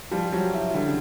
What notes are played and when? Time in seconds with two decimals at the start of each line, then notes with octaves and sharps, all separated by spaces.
0.11 F3 G3
0.32 F#3 G3
0.54 E4
0.74 D3 G3
0.85 C#3